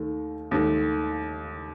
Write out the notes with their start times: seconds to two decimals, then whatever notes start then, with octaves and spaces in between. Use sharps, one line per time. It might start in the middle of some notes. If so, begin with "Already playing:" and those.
Already playing: D#2 D#3 A3
0.51 D#2 D#3 A3